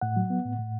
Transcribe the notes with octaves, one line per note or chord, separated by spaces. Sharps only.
A2 F#5
F#3
B3
A2
A2